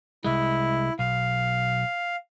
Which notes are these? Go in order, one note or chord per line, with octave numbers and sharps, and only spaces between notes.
C2 G#3 E4
B1 F5